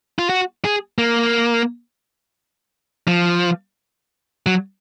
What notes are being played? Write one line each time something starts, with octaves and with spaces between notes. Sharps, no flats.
F4
F#4
G#4
A#3
F3
F#3